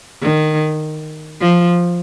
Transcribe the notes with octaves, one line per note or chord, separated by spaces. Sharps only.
D#3
F3